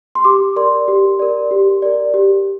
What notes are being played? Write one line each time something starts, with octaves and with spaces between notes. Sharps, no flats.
C6
G4 D6
A#4 D5 C6
G4
A#4 D5
G4
A#4 D5
G4